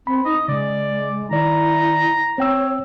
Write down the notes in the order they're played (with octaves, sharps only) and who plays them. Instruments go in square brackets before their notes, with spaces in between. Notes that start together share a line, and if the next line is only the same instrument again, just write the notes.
[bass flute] C4 [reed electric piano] B5
[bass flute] D#4 [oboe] D#5
[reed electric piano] C#3 [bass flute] G#3 [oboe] D5
[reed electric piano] D#3 D5 [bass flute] E4 [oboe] A#5
[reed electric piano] C4 G5 E6 [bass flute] C#5